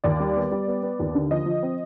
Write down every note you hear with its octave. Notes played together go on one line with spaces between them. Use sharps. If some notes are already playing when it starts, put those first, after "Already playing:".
D#2 D5
G3
B3
G3
B3
B3
D#2
D3
F3 D#5
F3
C4